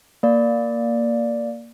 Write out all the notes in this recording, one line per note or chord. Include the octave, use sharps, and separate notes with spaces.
A#3 D5